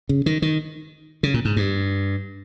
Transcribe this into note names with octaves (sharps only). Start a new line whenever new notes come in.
C#3
D#3
D#3
C#3
A#2
G#2
G2